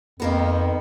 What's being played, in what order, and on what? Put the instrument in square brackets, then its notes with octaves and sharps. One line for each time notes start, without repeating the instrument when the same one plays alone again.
[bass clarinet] F2 [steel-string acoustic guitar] D#3 A#3 B3